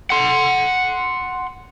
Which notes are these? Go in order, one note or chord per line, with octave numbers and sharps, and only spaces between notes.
F#5 C6